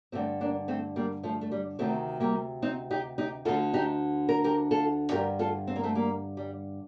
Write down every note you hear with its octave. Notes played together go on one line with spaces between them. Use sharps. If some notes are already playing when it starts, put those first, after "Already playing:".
G2 D3 A3 C4
A#3 D4
A3 C4
G3 A#3
F3 A3
A3
G3
D2 C3 D#3 A3 C4
G3 A#3
C4 D#4
D#4 G4
D#4 G4
D2 D3 F4 A4
D#4 G4
A#4
G4 A#4
F4 A4
G2 D3 G4 A#4
F4 A4
C4
A#3
A3 C4
G3 A#3
G3